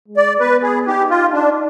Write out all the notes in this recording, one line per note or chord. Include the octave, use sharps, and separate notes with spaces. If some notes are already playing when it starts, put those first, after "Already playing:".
G#3
D5
B3 B4
G#4
D#4 G4
F4
D4